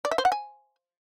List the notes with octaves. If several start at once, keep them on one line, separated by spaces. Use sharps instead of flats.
D5
E5
C5
F#5
G#5